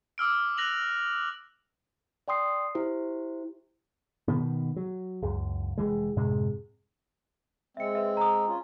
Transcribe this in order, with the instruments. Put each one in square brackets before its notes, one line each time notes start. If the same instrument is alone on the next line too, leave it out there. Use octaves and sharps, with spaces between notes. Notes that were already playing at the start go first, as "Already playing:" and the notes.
[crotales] D6 E6 F6 D7
F#6 A#6 F7 F#7
[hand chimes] D5 G5 C6 D#6 C7
E4 G4 C5
[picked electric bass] B2 D#3 B3
F#3
C#2 F#2
F1 D2 E3 G#3
F#2 A2 C3 G#3
[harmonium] G#3 C4 [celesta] E5 C#7
[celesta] B4 E5
A#5 D#6
[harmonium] C#4 F4